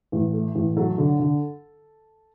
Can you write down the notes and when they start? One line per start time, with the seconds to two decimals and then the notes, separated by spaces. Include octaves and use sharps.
0.12 A1
0.33 A3
0.55 A1
0.77 F#3 A4
0.98 D3
1.19 D3